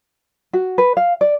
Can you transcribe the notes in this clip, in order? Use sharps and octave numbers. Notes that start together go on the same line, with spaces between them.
F#4
B4
F5
D5